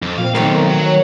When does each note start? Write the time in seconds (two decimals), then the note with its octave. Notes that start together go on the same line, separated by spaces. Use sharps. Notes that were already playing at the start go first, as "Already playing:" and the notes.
0.02 F2
0.18 A#2 C4 F5
0.35 B1 D#3 A3 A#3
0.55 A#4
0.69 F#3
0.85 C#5